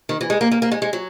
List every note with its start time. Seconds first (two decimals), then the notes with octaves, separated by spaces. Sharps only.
0.09 D#3
0.21 E3
0.30 G#3
0.41 A#3
0.52 A#3
0.62 A#3
0.72 G#3
0.82 G#3
0.93 F#3